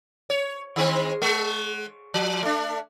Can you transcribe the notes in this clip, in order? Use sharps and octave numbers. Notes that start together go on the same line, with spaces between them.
C#5
D#3 G#3 C4
G#3
F3
A3 D4